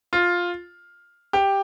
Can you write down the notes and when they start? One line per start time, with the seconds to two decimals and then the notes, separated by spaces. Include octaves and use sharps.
0.13 F4
1.33 G4